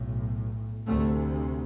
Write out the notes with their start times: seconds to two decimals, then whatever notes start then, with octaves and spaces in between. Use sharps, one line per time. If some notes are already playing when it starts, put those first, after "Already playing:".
Already playing: B1 A2
0.86 D2 C3 A3